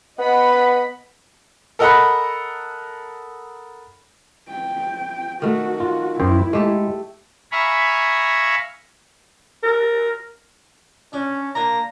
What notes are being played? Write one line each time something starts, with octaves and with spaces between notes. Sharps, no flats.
B3 D#5 F#5 B5
A4 A#4 D#5 F#5 A#5 B5
G5
D#3 A3 F#4
F4
F#2 E4 C5 G5
G#3 A3 G4 A4
E5 F5 G#5 A#5 B5 C#6
A#4
C#4 D4
A#3 D4 G#5 A#5